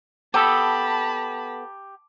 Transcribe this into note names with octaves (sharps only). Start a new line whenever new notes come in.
B3 G4 A4 A5 B5